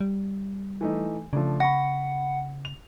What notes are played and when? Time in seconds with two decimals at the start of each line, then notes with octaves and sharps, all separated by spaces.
0.01 G3
0.81 E3 A3 D#4
1.33 C#3 F3 A3 D4
1.60 F#5 B5 C#6 A#6
2.65 F7